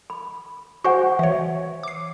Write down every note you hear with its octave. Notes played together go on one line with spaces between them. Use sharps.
B5
F#4 C5 F#5 G#5 C#6
E3 C#5 E5
D6 C7